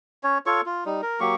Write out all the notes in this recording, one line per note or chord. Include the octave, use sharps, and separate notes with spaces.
C#4 C#5
F4 A4 C#5 C#6
F4
G3 D#4
A#4
F#3 A#3 G4 C#6